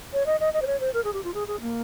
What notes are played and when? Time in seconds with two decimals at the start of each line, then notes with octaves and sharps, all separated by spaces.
0.13 C#5
0.26 D#5
0.40 D#5
0.54 D#5
0.62 C5
0.67 C#5
0.80 C5
0.94 A#4
1.04 G#4
1.14 G4
1.24 F4
1.34 G#4
1.48 G#4
1.61 A#3